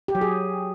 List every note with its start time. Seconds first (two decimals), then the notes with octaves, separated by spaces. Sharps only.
0.08 G4
0.15 F#3
0.21 G#4